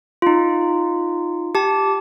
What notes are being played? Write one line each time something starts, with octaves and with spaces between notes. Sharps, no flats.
D#4 F4
G4 A5